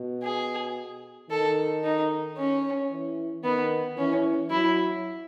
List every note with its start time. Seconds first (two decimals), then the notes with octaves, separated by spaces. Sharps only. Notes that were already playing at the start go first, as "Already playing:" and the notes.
Already playing: B2
0.24 G#4
1.31 D#3 A4
1.84 D#4
2.38 C#4
2.91 E3
3.44 D#3 B3
3.98 E3 C#4
4.50 F#3 E4